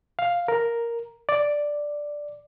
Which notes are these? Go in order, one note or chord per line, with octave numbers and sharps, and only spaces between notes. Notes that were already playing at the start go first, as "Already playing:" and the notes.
F5
A#4
D5